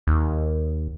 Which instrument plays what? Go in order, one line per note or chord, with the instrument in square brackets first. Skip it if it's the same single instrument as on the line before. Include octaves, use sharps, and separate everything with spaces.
[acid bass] D#2